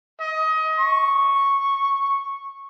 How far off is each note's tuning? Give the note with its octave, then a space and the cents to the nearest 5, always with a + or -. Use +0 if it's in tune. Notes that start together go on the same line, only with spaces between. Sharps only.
D#5 +25
C#6 -5